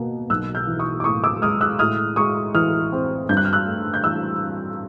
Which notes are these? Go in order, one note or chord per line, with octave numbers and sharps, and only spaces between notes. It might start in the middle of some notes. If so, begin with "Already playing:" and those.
Already playing: B2 A#3
B1 E6 F#6
F6 G6
E3
C#6 D#6
D6
A2 C#6 D#6
D6 E6
G#3 D#6 F6
E6 F#6
A2 D#6 F6
G#3 C#6 D#6
E3 D#6 F6
C4
G2 G6
F#6
F6
E6 F#6
A3
G6
E3 E6 F#6
C4